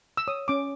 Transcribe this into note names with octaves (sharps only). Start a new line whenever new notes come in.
E6
C#5 D#6
C#4 D6